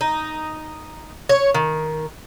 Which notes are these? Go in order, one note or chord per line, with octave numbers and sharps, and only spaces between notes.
D#4
C#5
D#3